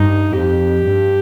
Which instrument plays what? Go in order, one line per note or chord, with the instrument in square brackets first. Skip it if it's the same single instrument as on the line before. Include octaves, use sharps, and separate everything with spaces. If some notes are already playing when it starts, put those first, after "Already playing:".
Already playing: [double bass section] G2 [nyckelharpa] D#4
[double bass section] F2 [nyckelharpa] G4
[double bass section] G2